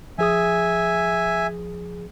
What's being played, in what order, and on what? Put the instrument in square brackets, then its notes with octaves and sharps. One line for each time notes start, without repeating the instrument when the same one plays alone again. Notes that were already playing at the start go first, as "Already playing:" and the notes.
[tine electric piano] F3 G#4 D#6 [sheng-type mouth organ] E5 G#5